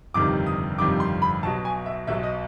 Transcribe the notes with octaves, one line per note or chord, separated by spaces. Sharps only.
G1 F2 C3 D#3 G3 D6
D#6
G1 F2 C3 D#3 G3 D6
C6
B5
B1 B2 F#3 A5
G#5
E5
B1 B2 F#3 E5
D#5